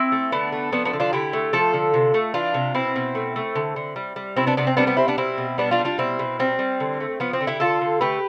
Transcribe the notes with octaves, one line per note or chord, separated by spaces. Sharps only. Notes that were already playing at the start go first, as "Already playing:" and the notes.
Already playing: C4 E4
A3
D3 B3 D4
A3
F3 B3 D4
B3 D4
D3
D4 F4
D3 E4 G4
A3
F3 F4 A4
D3
C3
A3
E3 D4 F4
C3
B2 C4 E4
B2
A3
A3
D3
D3
G3
G3
C3 C4 E4
B3 D4
C3 B3 D4
C4
G3 B3 D4
B3 D4
G3 C4 E4
B3 D4
B2 C4 E4
B2
G3 B3 D4
D4 F4
G3
D4 F4
B2 C4 E4
B2
G3 C4
G3
D3
A3
F3 B3
C4
D3
E4 G4
D3 F4 A4
D3
A3 G4 B4